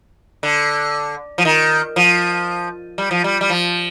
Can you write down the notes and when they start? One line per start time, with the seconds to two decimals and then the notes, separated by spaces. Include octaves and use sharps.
0.43 D3
1.38 F3
1.45 D#3
1.96 F3
2.98 G3
3.11 F3
3.24 G3
3.41 G3
3.50 F3